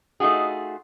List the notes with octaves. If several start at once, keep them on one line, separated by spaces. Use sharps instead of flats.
A3 D#4 F4 F#4 G#4